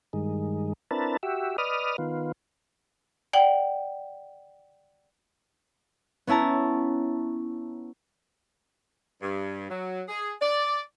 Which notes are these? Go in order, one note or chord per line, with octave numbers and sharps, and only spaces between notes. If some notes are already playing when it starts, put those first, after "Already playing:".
G2 D#3 G#3
C4 D4 E4 A#4 B4 A5
F#4 G4 E5
B4 D5 D#5 D#6 F6
D#3 B3 F4
D5 F#5 G5
B3 C#4 E4 A5 A#5
G2
F#3
G#4
D5